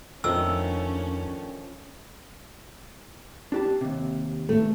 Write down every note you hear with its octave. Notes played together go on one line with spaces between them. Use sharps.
F2 D#3 F3 A3 C#4 D4 E6
D4 G4 A5
D#2 C3
A3